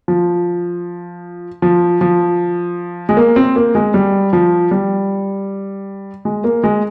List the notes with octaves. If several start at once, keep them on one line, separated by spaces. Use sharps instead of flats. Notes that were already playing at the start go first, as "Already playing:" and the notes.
F3
F3
F3
G#3
A#3
C4
A#3
G#3
G3
F3
G3
G#3
A#3
G#3